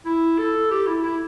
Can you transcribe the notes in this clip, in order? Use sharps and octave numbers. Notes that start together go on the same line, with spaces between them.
E4
A4
G4
E4
E4